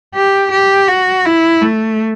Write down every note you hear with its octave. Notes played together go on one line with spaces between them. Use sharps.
G4
G4
F#4
E4
A3